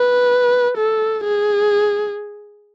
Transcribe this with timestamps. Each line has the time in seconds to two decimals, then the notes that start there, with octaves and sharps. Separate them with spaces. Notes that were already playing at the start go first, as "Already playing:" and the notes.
Already playing: B4
0.78 A4
1.24 G#4